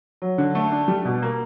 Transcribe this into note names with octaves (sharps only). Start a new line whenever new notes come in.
F#3
D3
A3
D4
G3
B2
A#3